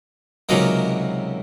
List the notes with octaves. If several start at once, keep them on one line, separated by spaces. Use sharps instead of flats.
C#2 C3 D#3 F#3 A#3 D#5